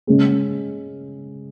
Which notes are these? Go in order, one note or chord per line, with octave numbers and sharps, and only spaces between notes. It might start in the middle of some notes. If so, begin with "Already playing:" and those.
C#3 G#3 C#4 G#4